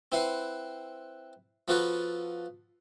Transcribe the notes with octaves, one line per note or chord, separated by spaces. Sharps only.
C4 E4 B4 F#5 C6
F3 B3 F4 F#4 A4 B4